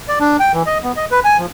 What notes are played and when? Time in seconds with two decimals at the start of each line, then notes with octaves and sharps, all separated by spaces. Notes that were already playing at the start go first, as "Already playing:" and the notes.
0.08 D5
0.20 D4
0.40 G5
0.53 E3
0.66 D#5
0.83 B3
0.97 D#5
1.11 B4
1.25 G#5
1.38 F3